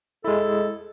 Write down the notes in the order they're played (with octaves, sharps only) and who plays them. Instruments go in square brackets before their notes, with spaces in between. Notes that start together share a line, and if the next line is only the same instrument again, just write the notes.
[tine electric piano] G#3 E4 [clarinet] A4